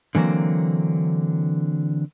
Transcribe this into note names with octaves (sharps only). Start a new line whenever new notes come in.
D3 E3 F#3 A#3 C4